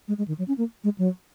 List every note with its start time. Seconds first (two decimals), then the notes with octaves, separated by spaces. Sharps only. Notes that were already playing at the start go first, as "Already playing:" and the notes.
0.08 G#3
0.18 G#3
0.28 D#3
0.38 F#3
0.48 C#4
0.58 A#3
0.84 G#3
0.98 F#3